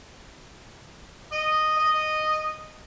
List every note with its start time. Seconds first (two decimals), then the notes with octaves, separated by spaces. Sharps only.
1.32 D#5
1.79 D#5